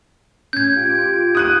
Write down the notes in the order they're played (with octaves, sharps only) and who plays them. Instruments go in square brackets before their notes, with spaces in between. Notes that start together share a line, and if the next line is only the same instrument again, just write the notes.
[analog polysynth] A2 C#4 [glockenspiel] G6 G#6
[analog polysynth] F4 G4 D7
[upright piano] D#6 F#6 D#7